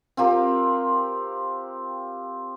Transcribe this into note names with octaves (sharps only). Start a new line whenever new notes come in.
C4 F4 G4 A#4